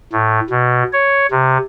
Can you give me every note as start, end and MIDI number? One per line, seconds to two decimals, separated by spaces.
0.13 0.40 45
0.50 0.83 47
0.93 1.26 73
1.31 1.58 48